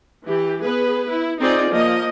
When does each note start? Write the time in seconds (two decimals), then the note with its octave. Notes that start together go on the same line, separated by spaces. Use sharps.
0.25 E3 G4
0.63 B3 G#4 B4
1.10 E4
1.40 C4 D#4 F4 G#4 D5 D#5
1.72 F3 A#3 D#5